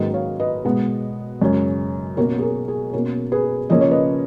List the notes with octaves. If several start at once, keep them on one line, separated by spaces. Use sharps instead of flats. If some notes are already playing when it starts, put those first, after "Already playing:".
Already playing: G#2 D#3 F#3 A#3 C#4 B4 D#5
C#5 F5
B4 D#5
B2 G#3 B3
F#2 C#3 G#3 C#4
B2 A#3 C#4 A#4 C#5
G#4
A#4
G#4
B2 A#3 C#4 A#4
G#4 B4
C#3 F3 A#3 C#4 D#5
C#5
B4 D#5